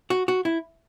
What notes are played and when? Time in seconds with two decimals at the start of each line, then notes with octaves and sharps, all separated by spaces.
0.10 F#4
0.28 F#4
0.45 E4